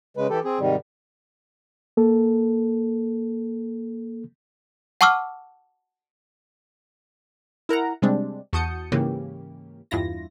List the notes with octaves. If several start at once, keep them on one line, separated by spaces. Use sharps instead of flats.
C#3 G#3 B4
E3 G4 A4
C4 G#4
G#2 C3 D#3 G3
A#3 A4
F#5 A5 C#6 D6 E6 F6
E4 A#4 F#5 A#5
C3 G3 G#3 C4 D4
E2 F#4 A5 D#6 G6 C#7
G#2 C#3 E3 A#3 C#4 G4
E2 G2 E4 F4 A#6